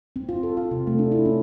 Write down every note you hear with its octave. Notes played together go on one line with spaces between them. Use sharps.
C4
F4
A4
F4
C3
A3
D4
E4
C#4